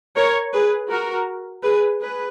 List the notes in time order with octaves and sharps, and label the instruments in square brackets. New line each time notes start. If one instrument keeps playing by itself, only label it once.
[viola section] A#4 C#5
G#4 B4
F#4 A#4
G#4 B4
G#4 B4